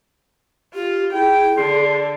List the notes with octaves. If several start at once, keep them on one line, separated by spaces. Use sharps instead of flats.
F4 G4
E4 G#4 G5
D3 C6